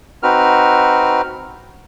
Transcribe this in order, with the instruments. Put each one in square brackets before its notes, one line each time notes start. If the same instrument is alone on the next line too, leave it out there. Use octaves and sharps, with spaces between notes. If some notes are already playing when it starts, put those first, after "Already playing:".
[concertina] C4 D#4 F#4 B4 F6